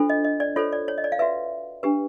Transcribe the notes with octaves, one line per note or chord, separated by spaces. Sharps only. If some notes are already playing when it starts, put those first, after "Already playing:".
Already playing: D4 F4 A4 C5
D#5
D#5
D5
F4 A4 C5 C#5
D5
C#5
D#5
D5
F5
F#4 B4 E5
D4 G4 B4